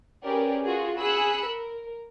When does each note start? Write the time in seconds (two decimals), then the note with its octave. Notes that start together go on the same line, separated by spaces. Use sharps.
0.25 C#4 G4 G#4 A#4 B4 D5
0.65 F4 F#4 G#4
0.98 G#4 B5 E6 F#6 C#7
1.49 A#4